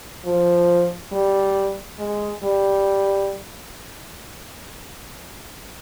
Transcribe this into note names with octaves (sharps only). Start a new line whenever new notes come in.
F3
G3
G#3
G3